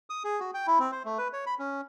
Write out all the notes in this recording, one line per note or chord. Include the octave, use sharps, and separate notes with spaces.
D#6
G#4
F#4
G5
E4
C4
C5
A3
B4
C#5
B5
C#4